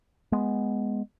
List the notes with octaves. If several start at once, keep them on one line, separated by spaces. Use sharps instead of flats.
G#3 B3